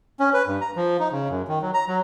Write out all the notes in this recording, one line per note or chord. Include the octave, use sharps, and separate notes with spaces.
C#4
B4
G2
A#5
F3
D#4
C#3
F#2
D#3
F#3
A#5
F#3